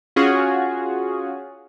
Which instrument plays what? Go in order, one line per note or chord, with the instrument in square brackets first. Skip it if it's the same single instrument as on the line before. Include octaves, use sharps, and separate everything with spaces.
[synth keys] C#4 F4 F#4 G#4